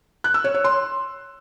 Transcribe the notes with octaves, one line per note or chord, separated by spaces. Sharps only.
F#6
E6
C#5
C#5
C6